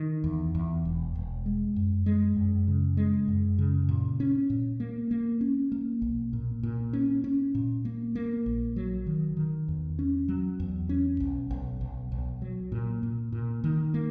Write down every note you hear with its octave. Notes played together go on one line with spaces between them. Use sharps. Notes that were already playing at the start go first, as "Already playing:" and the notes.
Already playing: D#3
E2
E2
E1
E1
G#3
F#2
G#3
F#2
C#3
G#3
F#2
C#3
A#2
C#4
A#2
A#3
A#3
C#4
A#3
B1
A#2
A#2
C#4
C#4
A#2
A#3
A#3
A#1
F#3
D#3
D#3
E2
C#4
F#3
E2
C#4
B1
B1
B1
B1
F#3
A#2
A#2
A#2
D#3
A#3